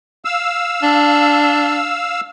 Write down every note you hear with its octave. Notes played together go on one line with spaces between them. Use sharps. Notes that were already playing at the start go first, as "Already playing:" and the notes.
F5 E6
D4